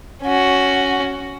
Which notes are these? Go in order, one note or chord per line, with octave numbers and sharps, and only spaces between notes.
C#4 F#4